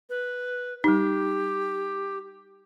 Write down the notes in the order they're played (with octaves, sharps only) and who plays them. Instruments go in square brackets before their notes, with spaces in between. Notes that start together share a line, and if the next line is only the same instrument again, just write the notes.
[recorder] B4
[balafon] G3 D#4 [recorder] G4